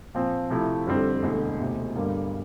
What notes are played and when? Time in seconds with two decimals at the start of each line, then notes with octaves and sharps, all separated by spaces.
0.14 A#2 F3 C4
0.50 C3 F3 A3 E4
0.87 F2 D3 G3 C4
1.23 E1 D2 D3
1.60 E1 D2 C3
1.95 G2 D3 G3 A#3